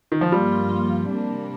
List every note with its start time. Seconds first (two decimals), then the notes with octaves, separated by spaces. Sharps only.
0.12 D#3
0.21 F3
0.32 G2 F3 G3 A#3 F4
1.09 C3 G3 A#3 D4